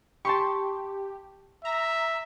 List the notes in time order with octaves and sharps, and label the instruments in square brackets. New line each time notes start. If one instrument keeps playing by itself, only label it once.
[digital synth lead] G4 [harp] A5 C6 C#6
[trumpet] E5 [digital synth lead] A#5